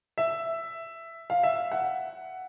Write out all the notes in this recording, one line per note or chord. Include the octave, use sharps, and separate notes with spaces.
E5
F5
E5
F#5